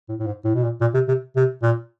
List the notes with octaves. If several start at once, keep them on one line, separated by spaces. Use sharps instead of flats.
A2
A2
G#2
A2
B2
A#2
A#2
C3
C3
C3
A#2